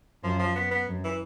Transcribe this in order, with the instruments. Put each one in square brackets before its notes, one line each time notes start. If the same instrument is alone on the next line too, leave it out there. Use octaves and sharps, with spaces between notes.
[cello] F#2 [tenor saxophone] F3
[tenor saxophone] F3
B3
B3
[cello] F#2
[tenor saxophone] E3